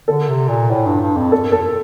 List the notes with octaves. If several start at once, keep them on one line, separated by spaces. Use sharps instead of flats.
D3 A4
C3
A#2
A2
G2
G2
F2
A4
A4